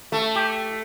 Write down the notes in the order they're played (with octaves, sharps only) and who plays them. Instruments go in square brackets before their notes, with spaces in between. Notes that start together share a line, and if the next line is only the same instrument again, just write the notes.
[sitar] A3
[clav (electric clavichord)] G4